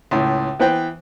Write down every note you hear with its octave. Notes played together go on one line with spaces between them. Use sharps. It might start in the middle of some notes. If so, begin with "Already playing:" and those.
C#2 A2
E3 B3 B4 C5 G5